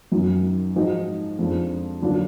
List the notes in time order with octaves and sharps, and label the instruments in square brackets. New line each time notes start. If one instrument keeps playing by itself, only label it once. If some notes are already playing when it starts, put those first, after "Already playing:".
[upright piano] F#2 D#3 F#3
G#2 F3 G#3 D#4 F#4
F2 F3 G#3 D4 F4
D#2 D3 F#3 D4 F4